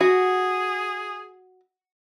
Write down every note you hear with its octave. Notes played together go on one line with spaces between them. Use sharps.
F#4 G#4